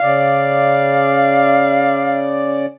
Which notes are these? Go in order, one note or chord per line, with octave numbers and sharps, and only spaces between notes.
C#3 D5 F5